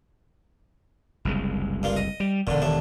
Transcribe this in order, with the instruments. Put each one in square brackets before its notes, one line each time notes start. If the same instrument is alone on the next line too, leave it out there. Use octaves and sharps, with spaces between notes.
[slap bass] F#1 C2 G#3
[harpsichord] G2 A#3 F4
D#5
[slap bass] G3
[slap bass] E1 [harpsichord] A#2 D3
[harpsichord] D#2 A2 D4